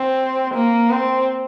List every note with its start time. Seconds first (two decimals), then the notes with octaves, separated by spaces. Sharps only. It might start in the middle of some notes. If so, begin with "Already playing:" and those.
Already playing: C4
0.54 A#3
0.91 C4